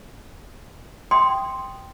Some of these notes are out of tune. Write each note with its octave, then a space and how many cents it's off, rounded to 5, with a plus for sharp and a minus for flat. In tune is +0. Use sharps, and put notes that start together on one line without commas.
G5 +0 C6 +0 D#6 +0